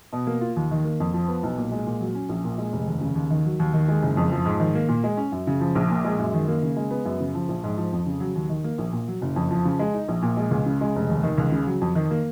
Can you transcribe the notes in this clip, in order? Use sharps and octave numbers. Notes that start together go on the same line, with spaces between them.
B2
A#3
F4
D#2
D#3
A#3
F2
F3
B3
B1
A#2
G#3
A#2
F#3
C#4
A#1
A#2
G#3
F1
D#2
C#3
D#2
D#3
F#3
D#2
D#3
G#3
F#1
F2
F3
G#2
D#3
A#3
A#2
G#3
C#4
F#2
C#3
F3
A#1
A#2
G#3
F#2
D#3
A#3
C#3
G#3
B3
F#2
C#3
F3
A#1
G#2
F3
F2
C#3
F#3
D#2
D#3
A#3
A#1
A#2
F#3
F#1
F2
F3
C#3
G#3
D#4
A#1
A#2
G#3
C#2
C#3
G#3
F1
D#2
D#3
C#2
C#3
F#3
F2
D#3
A#3